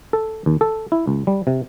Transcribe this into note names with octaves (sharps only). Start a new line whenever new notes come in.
A4
D#2
A4
E4
C#2
G3
C3